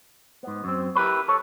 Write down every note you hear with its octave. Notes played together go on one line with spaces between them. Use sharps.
G#2 B3
F#2 C4
E4 G4 A#4 B4 C#5
A4 C#5